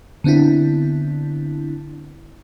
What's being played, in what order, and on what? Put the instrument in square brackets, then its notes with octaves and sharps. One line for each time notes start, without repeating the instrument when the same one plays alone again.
[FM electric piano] D3 B3 C4 D4 E4